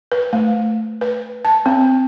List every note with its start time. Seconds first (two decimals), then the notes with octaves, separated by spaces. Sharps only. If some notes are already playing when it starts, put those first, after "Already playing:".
0.12 B4
0.33 A3
1.01 B4
1.45 A5
1.66 C4